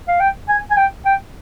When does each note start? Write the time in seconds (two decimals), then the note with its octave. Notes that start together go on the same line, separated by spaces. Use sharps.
0.08 F5
0.20 G5
0.49 G#5
0.71 G#5
0.77 G5
1.06 G5